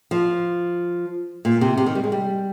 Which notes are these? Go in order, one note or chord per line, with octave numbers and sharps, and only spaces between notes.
F3
A#2
C3
C3
D#3
G3
G#3
G3